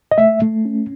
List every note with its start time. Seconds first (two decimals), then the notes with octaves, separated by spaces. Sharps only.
0.11 D#5
0.18 A3 E5
0.42 A3
0.65 C#4